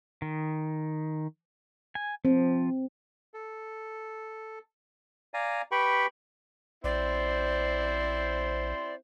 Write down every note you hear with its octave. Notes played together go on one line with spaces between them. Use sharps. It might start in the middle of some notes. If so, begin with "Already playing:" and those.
D#3
G#5
F3 C4
A4
D5 F5 G#5 A#5
G4 B4 G5 B5 C#6
A#1 C4 E4 C5 D5